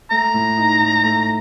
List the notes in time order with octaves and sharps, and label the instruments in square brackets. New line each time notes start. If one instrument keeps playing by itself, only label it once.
[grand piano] A3 [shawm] A#5
[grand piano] A2
D#4
A2
A3